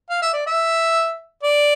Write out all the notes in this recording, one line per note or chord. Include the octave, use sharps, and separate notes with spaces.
F5
E5
D5
E5
D5